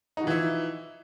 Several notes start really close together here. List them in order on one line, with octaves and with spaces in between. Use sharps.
D#4 F#4 F3 E3 E4